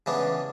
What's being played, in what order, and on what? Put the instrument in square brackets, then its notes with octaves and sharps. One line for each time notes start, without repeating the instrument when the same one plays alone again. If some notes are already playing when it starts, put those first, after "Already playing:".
[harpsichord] C#3 E3 B3 D4